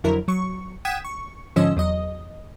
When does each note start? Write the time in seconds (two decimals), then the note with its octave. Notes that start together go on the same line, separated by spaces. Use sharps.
0.04 F2 D3 F#3 E4 A#4
0.28 F#3 C#6
0.85 F#5 G5 D#6 G#6 B6 E7
1.04 C#6
1.56 G#2 D3 F3 C#4 D#5 E6
1.76 E2 F#3 D#5